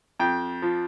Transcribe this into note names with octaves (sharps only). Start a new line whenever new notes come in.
F2 G5
F3